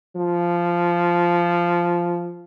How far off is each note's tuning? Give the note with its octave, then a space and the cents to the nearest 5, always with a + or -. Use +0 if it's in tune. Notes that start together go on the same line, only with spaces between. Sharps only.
F3 -10